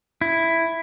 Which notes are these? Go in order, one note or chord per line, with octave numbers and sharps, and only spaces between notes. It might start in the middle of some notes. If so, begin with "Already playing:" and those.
E4